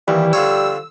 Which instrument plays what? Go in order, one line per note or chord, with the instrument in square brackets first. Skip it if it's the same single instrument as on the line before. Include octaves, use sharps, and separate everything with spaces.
[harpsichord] D#2 [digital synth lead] E3 [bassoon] G3
[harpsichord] D3 F3 C#5 [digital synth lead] E6